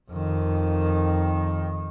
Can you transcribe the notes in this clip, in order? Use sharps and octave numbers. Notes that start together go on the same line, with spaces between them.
F2 D#3